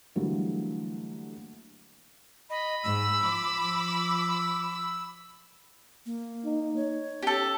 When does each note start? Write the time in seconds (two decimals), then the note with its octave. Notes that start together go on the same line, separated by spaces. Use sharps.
0.15 D3 E3 F#3 G3 A3 A#3
2.50 D#5 B5
2.84 G#2 E6
3.21 F3 D6
6.06 A#3
6.45 D#4
6.76 C#5
7.22 C#4 G4 A4